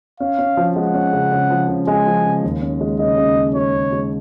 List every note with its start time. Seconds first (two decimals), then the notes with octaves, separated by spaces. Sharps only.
0.20 C#4 F5
0.39 C#4
0.57 F3
0.76 G#3 F#5
0.94 C#4
1.13 C#3
1.32 C#3
1.50 F3
1.68 C#3
1.87 G#3 G#5
2.06 F3
2.25 C#3
2.43 D#2
2.62 C#4
2.81 G#3
2.99 C#3 D#5
3.18 C#3
3.36 C#3
3.55 G#3 C#5
3.74 C#3
3.92 G#3